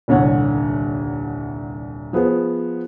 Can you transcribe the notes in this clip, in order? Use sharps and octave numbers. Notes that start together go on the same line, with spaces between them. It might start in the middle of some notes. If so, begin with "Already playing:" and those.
D#1 C2 D3 C#5 F#5
F3 B3 G#4 C5